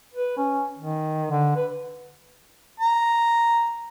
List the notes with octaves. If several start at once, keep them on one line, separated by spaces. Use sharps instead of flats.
B4
C#4
D#3
D3
B4
A#5